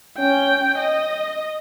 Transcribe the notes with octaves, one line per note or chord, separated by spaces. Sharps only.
C#4 G5
D#5